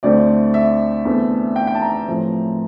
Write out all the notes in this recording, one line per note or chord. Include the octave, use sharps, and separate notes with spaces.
D2 D3 A3 C4 D5
E5
E2 D3 A3 C4
G5
G5
A5
A#5
A1 A2 F3 A3 C4